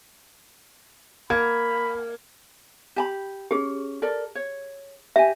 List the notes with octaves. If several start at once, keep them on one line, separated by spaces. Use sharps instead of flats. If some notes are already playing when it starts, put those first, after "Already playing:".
A#3 B5 G#6
G4 A5 B5
C#4 G4 G#4
A4 A#4 D5
C#5
G4 E5 G#5